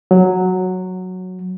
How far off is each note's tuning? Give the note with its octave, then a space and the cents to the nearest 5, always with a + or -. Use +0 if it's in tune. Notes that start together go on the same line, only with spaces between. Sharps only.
F#3 -5